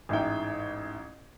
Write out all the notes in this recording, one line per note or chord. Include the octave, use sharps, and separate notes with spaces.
A1 G#2 E4 G5